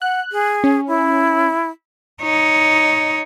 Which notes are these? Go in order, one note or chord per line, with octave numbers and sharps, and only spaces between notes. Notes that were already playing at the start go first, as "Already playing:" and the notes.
F#5 F#6
G#4
C#4
E4
D#4 C#5